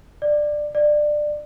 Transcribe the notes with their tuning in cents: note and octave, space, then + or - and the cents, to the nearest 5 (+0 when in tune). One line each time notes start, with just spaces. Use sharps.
D5 +15
D5 +20